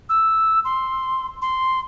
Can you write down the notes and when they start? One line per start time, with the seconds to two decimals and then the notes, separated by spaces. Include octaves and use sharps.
0.09 E6
0.65 C6
1.42 C6